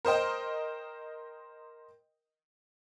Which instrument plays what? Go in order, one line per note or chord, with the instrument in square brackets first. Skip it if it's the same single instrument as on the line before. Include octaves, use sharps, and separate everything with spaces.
[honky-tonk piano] A#4 C5 D#5 G5